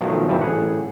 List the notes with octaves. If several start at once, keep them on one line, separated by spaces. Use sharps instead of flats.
B1 D#3 F3 F#3 A3
G#1 D2 E3 G3 C4 A5
A1 G#4 F#5